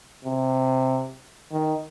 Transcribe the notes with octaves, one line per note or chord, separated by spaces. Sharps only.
C3
D#3